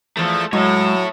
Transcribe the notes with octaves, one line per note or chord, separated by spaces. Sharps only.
E2 F3 A3 A4
A2 F#3 G#3 A4 C#5